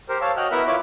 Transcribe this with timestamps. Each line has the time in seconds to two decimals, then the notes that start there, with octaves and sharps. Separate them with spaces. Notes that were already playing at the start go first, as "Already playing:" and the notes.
0.09 G4 A#4 C5
0.21 C#5 F5 A5 E6
0.37 F#4 D#5 G5 F6 F#6
0.51 B3 E4 A#4 E5 F#5
0.67 E4 F4 C#5 E5 B5 D6